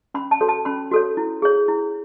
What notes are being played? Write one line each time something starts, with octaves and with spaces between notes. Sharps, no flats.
C#4 B5
A5
F#4 A4 C#5
A5
C#4 B5
F#4 A4 C#5
E4
G#4 C#5
E4